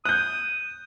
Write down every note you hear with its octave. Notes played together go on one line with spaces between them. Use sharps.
D#6 F#6 G6